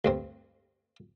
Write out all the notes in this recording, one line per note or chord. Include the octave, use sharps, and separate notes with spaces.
D2 G2 C4